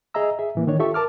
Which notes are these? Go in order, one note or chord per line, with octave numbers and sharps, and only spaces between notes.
G#4 D#5 E5 A#5 E6
G#4 E5
A2 E3 A#3
D#3 D4 C#5
F4 G4 A4 E5 C#6
A#4 A5 D6 F6